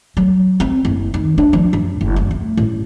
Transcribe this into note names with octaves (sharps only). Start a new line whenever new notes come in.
F#3
C4
F#1
D#3
D4
F3
F#2
F#1
F#2
A3
A1